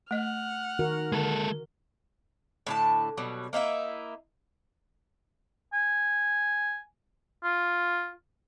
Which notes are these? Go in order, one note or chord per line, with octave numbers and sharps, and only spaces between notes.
A3 D#5 F#5 F6
D#3 F#4 A#4
D3 G#3 A4
A2 D3 A5
B2 F#3 G3
A#3 D#4 E4 E5
G#5
F4